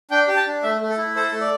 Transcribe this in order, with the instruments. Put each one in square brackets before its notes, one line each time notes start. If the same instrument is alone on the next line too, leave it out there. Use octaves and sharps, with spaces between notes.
[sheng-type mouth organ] D4 G5
G4
A5
D4
A3 E5
A3
A4
E4
A4 C5
A3
D5